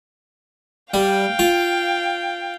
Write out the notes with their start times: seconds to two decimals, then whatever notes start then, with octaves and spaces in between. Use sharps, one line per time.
0.94 G3 F5 G5
1.39 F4